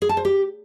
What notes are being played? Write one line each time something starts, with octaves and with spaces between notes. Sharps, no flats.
G#4
A5
C5
G4